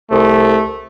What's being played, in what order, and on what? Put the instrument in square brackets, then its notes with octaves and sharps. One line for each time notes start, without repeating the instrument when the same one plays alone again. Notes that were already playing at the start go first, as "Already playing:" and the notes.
[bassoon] C2 [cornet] A3